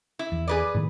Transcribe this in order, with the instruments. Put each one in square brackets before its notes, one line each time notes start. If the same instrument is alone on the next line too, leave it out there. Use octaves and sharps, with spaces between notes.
[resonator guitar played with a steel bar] E4
[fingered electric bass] E2
[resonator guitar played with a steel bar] G#4 B4 D5
[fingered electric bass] A2 D#3